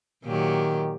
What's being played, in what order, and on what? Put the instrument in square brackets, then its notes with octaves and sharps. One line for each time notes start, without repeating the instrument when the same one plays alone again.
[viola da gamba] A#2 F#3 G4 [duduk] D#3